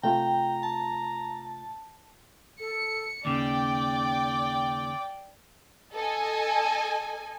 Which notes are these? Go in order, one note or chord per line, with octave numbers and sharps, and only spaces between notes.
C3 A3 F4 G5 A#5
A5
A4 C#7
D#2 C#3 D5 G5 D6
A4 D#5 G#5